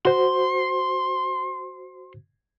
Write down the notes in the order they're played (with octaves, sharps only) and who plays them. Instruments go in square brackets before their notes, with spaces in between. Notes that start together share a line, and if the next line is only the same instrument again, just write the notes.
[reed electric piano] F#4 C5 [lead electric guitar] C6